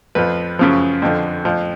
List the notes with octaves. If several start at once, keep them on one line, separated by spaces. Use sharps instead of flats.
F2 F3 B4
F#2 C#3 F3
F2 D3 F3
F2 F3